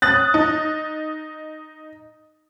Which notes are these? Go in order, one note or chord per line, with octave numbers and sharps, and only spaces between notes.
D#6 F#6 A6
D#4